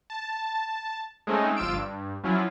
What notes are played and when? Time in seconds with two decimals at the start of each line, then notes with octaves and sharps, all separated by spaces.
0.10 A5
1.27 G#3 A3 C4 C#4 D#4
1.57 G1 F3 F4 E6 D7
1.73 G2
2.24 F3 F#3 C#4 E4 F4